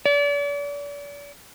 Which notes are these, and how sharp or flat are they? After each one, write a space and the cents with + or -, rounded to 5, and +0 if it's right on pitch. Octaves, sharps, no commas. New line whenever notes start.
D5 -40